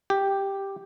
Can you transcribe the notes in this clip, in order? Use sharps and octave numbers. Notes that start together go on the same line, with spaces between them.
G4